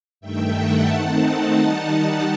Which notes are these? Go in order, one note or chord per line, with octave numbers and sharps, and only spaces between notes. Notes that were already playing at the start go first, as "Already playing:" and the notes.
G2 D#3 A3 E5 G5
F#5 A5
D#3 A3 C4 D#4 F#5 A5
D#3 G3 D#4